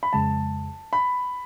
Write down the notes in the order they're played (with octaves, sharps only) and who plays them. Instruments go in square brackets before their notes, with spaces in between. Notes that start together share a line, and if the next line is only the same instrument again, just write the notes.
[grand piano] B5
[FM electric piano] F2 C#3 G#3 [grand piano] A5
[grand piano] B5